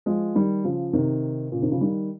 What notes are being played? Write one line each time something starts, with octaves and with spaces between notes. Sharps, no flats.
F3 G#3
D#3 G3
C#3 F3
C3 D#3
A#2 C#3
C3 D#3
C#3 F3
D#3 G3